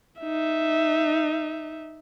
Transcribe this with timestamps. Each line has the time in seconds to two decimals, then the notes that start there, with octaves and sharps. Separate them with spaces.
0.21 D#4 E5